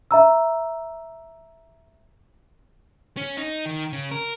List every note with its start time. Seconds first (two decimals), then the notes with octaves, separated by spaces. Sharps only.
0.11 E5 A#5 E6
3.17 C#4
3.37 D#4
3.66 D#3
3.93 C#3
4.11 A#4